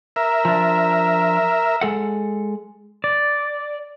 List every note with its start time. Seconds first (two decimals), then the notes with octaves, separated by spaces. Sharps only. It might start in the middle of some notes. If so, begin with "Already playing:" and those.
0.16 A#4 E5
0.45 F3 D4
1.81 G#3 A4 F#5
3.04 D5